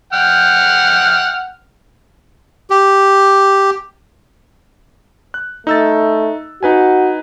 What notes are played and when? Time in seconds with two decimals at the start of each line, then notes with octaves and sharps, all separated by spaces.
0.13 F#5 G5 F6
2.70 G4
5.34 F#6
5.67 A3 D#4 E6 A6
6.63 D#4 F#4 B4 G#5